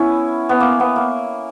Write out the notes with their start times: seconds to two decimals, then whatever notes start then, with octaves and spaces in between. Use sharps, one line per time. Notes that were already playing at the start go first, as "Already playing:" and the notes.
Already playing: B3 C#4 E4
0.49 B3
0.60 A#3
0.80 B3
0.96 A#3